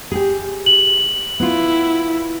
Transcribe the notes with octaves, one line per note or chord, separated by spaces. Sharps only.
G4 G#4
F#7
B3 E4 F4